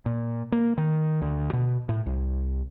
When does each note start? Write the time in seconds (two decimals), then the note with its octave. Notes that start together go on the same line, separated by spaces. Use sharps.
0.06 A#2
0.52 A#3
0.78 D#3
1.22 D2
1.53 B2
1.89 A2
2.06 C2